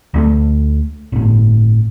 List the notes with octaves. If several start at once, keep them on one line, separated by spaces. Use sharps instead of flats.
D2 G#3 A3
G1 A2